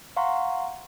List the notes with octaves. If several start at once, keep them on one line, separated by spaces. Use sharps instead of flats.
F5 F#5 A#5 C6 C#6